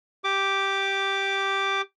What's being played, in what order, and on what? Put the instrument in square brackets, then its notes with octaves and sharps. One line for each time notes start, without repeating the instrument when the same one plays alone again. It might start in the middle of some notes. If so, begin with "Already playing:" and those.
[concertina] G4 D6